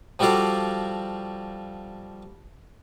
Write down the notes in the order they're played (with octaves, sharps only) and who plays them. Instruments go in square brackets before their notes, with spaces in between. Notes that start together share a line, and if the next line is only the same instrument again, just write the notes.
[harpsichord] F3 G3 F#4 A4 D5 F5